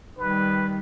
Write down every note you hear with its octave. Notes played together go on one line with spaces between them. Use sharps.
D#3 G3 B4